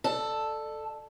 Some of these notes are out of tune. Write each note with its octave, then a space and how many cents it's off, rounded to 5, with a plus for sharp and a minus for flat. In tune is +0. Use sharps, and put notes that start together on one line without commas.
A4 +0 D5 +30